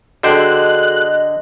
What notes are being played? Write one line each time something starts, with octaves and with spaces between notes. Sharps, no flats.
D3 F#4 G#4 A4 C5 D#5 G5 F#6